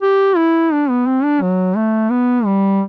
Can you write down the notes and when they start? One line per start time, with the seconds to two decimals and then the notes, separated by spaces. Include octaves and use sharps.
0.02 G4
0.37 E4
0.72 D4
0.89 B3
1.07 C4
1.23 D4
1.42 F#3
1.76 A3
2.10 B3
2.45 G3